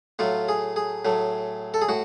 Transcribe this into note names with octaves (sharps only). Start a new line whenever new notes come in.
A2 F#3 A3 F4
G#4
G#4
A2 F#3 A3
A4
G#4
A2 F#4